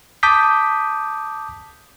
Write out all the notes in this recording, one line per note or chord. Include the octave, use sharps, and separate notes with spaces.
A5 D6 D#6 G6 B6